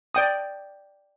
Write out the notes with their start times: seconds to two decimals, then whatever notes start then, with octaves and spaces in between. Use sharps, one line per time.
0.15 D5 G5 D#6